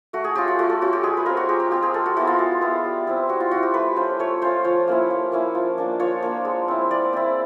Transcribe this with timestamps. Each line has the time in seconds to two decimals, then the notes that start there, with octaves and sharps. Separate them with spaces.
0.13 A3 F#4
0.24 G#4
0.35 C#4 F4 G4
0.48 F#4
0.59 A3 F#4
0.70 A4
0.81 C#4 F4 F#4
0.93 G4
1.03 G#3 G#4
1.17 B4
1.26 C4 F4 A#4
1.37 F#4
1.49 G#3 G4
1.60 G4
1.71 C4 F4 G4
1.83 G#4
1.94 G#3 A4
2.06 F#4
2.16 B3 E4 F#4
2.27 F4
2.39 G#3
2.61 B3 E4
2.84 G3
3.07 C4 E4
3.29 G3 F#4
3.40 F4
3.51 C4 E4 F#4
3.63 G4
3.74 A3 B4
3.96 C#4 F4 C5
4.19 A3 C#5
4.42 C#4 F4 C5
4.64 F3 C#5
4.88 A#3 C#4 E4
5.10 F3
5.32 A#3 C#4 E4
5.55 F3
5.78 A#3 D4
6.00 F3 C#5
6.22 A#3 D4
6.45 G#3
6.68 C4 E4
6.91 G#3 D5
7.13 C4 E4